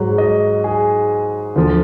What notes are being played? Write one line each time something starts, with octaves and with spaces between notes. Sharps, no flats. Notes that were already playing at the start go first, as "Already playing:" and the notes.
Already playing: G#2 F#3
D#5
G#4
D2 D3 F3